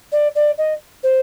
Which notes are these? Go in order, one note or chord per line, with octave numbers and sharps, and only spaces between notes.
D5
D5
D#5
C5